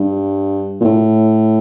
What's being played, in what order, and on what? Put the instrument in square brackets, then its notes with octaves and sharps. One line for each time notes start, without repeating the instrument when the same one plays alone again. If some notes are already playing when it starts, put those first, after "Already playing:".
Already playing: [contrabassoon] G2
A#2
A2